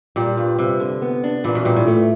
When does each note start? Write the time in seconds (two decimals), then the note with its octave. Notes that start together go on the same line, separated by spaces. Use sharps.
0.16 A#2 G3
0.37 G2
0.59 G2 C3
0.80 D3
1.02 B3
1.24 D4
1.44 A#2 E3
1.55 B2
1.65 A#2 G3
1.76 A2
1.87 A3